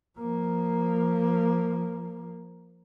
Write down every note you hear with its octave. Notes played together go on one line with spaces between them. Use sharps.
F3 A#3